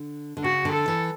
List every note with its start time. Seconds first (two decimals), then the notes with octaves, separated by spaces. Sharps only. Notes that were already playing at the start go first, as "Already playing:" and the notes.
Already playing: D3
0.37 D3
0.43 C#3 F#4
0.65 D3
0.72 A4
0.88 E3